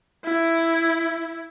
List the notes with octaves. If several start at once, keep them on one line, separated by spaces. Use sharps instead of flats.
E4